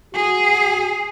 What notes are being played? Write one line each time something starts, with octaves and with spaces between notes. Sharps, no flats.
F#4 G#4